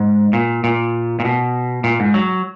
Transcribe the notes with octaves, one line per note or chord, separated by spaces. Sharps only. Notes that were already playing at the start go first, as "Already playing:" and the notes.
Already playing: G#2
A#2
A#2
A#2
B2
A#2
G#2
F#3